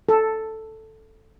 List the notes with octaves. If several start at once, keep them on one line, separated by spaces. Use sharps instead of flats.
A4